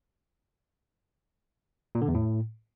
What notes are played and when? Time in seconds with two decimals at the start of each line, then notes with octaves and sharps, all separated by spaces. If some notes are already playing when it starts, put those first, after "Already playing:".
1.95 A#2
2.01 D3
2.08 E2
2.15 A2